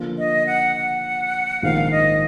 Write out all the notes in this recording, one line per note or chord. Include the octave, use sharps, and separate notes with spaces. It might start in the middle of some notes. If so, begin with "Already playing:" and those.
Already playing: D3 F3 A#3 F4
D#5
F#5
F#5
A#1 G#2 D#3 A#3 F5
D#5